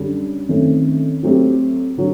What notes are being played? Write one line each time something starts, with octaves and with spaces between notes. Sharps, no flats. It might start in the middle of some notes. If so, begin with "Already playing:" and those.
Already playing: F#2 D3 G3 D4
F#2 D#3 A3 C4
F#3 A3 C4 G4
D3 F#3